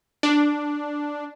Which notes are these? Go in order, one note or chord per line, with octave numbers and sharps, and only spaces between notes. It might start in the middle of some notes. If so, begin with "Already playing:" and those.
D4